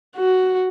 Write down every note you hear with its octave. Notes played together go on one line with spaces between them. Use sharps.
F#4